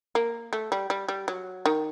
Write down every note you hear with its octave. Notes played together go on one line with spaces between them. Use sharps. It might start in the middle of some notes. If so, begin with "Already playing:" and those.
A#3
A3
G3
G3
G3
F#3
D#3